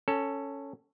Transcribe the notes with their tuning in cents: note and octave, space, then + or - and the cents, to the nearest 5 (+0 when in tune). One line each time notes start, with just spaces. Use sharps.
C#4 +0 A4 +15